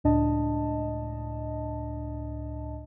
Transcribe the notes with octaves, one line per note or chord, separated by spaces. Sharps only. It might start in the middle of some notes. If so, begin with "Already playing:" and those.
C#2 A2 D4 D#5 A5